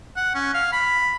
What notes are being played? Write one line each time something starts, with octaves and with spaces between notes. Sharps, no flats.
F#5
C#4
F5
B5